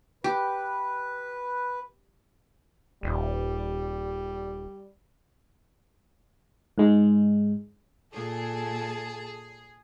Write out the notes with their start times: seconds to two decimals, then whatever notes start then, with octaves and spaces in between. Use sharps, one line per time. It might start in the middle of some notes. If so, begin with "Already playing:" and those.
0.24 G4 B4
3.03 D#1 G3
6.78 G#2 G#3
8.14 A#2 G#4 A4 A5